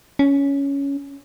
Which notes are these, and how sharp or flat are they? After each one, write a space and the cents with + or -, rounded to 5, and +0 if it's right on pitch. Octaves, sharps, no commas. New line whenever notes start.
C#4 +10